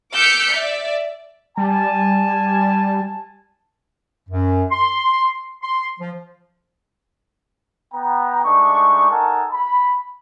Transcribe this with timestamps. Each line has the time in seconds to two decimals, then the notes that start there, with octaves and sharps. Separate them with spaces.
0.12 D6 E6 F6 G6 B6 C#7
0.53 D5 E5
1.57 G3 G#5 A5
4.29 F#2
4.71 C6
5.62 C6
6.00 F3
7.94 B3 G5 A#5
8.45 G#3 A3 D4 D#4 C#6
9.11 D#4 A4 A#4 F#5 G#5 A5
9.51 B5